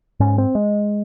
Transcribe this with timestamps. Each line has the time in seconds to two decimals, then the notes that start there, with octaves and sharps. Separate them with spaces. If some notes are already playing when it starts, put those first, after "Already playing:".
0.20 G#2 C#4
0.38 C4
0.55 G#3